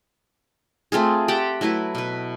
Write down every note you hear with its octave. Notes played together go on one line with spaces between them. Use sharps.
A3 C4 F4 G#4
G4 F#5 G5 A5
F#3 A3 E4 B4
B2 B4